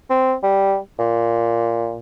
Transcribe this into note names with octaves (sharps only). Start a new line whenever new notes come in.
C4
G3
A#2